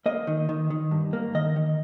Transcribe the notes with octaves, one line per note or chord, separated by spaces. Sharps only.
A#3 D#5
D#3
D#3
D#3
G2
A#3
D#3 D#5
D#3